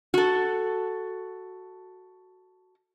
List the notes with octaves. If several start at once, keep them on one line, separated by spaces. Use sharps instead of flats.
F#4 A4